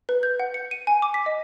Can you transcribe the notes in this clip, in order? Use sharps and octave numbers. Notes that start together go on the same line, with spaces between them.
B4
G6
F#5
C#7
D#7
G#5
D6
B6
D#5